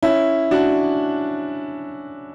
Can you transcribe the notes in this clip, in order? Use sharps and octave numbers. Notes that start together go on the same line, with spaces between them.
C#4 E4
D4 F#4